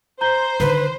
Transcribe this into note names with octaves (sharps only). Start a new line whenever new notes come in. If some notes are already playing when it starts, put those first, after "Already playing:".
C5 A#5 G6 G7
D3 D#3 B4